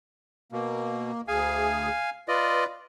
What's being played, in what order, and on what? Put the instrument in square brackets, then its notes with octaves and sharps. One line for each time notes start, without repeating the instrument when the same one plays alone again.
[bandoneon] B2 [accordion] A#3
[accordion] D2 G#4 [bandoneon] F5 G#5
[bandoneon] F4 D5 D#5 [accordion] B4